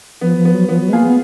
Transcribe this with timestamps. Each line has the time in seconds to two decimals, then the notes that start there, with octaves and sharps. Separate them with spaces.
0.21 F3 B3
0.38 F3
0.45 B3
0.54 F#3
0.69 F3 B3
0.81 F#3
0.89 G#3
0.93 A#3 F4 G#4
1.05 B3